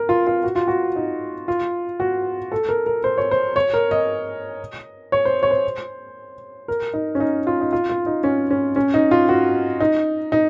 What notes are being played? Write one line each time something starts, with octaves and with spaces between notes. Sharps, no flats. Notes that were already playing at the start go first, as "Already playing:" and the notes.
Already playing: A#4
F4
F4
F#4
F4
F#4
D#4
F4
F#4
A4
A#4
A#4
C5
C#5
C5
C#5
A#4
D#5
C#5
C5
C#5
C5
A#4
D#4
C#4
D#4
F4
D#4
F4
F4
D#4
C#4
C#4
C#4
D#4
F4
F#4
D#4
D#4